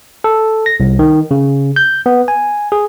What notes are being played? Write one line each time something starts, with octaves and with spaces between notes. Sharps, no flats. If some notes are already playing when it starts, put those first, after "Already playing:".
A4
A#6
C2
D#3
C#3
G6
B3
G#5
G#4